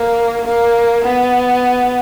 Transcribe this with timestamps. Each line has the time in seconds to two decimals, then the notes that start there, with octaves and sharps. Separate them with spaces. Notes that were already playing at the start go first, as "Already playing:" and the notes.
Already playing: A#3
0.45 A#3
1.03 B3